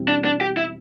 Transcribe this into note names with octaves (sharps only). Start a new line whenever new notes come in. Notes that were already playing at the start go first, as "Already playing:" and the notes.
Already playing: E1 E2 E3 G3 C4
D4
D4
G4
E4